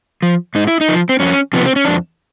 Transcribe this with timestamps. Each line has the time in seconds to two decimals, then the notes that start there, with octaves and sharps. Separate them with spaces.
0.22 F3
0.55 G#2 D#4
0.67 E4
0.81 D#4
0.88 F3
1.09 C4
1.20 F2 C#4
1.53 C3 F3 B3
1.66 C4
1.76 C#4
1.85 F2 D4